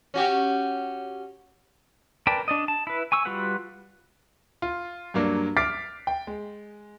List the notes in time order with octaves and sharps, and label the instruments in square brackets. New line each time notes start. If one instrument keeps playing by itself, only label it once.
[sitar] C#4 F#4 G4
[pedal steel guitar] A#4 B4 D5 G5 A5
D4 D5 D#5
A5
E4 B4
G#5 C#6 E6
G3 F4 F#4 B4 F#5
[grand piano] F4
G2 F#3 A#3 D4
D6 F6 A6 B6 C7 D7
G5
G#3